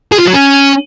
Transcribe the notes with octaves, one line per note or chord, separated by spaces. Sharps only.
G#4
F4
F#3
C#4